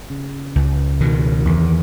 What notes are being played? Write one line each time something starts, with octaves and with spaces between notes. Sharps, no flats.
C#3
C#2
B2 D#3
E2